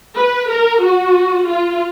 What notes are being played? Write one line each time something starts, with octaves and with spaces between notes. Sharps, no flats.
B4
A#4
F#4
F4